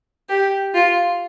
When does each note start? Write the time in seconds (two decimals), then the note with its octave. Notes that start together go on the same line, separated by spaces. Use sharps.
0.29 G4
0.75 F4